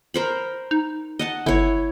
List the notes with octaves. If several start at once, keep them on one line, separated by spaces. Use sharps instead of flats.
A#4 C5 B5
D#4
D#5 F#5 A5
G1 E4 C#5